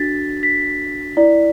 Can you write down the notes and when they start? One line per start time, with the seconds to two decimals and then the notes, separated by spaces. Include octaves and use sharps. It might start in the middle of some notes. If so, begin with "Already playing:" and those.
Already playing: D4 F#4 A4 A6 B6
0.43 B6
1.17 E4 D5